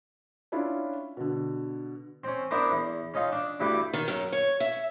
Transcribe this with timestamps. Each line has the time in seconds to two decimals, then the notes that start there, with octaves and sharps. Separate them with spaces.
0.52 C#4 D4 E4 F4 C#5
1.17 B2 D3
2.24 C4 C#4
2.51 B3 D4 E4 A#4 C5
2.71 E2
3.14 C#4 D#4 F4
3.32 D4
3.60 D2 G2 E4 B4 G5 D6
3.93 D#3
4.08 F#2
4.32 C#5
4.60 E5